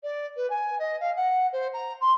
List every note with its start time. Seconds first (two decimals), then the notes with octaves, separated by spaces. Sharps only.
0.03 D5
0.36 B4
0.50 G#5
0.79 D#5
1.00 F5
1.16 F#5
1.52 C5
1.73 A#5
2.01 C6